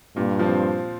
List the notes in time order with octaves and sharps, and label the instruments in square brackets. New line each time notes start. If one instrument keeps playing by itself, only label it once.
[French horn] G2 [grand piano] A#2
[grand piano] F3 C4